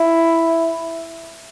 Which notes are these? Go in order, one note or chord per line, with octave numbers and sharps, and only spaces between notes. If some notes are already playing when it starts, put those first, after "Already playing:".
Already playing: E4